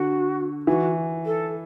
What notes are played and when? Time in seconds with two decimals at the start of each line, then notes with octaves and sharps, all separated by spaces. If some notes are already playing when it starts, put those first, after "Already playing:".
Already playing: D3 F#4
0.67 E3 F#4
1.25 A4